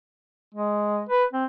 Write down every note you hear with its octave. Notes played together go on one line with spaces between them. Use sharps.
G#3
B4
C4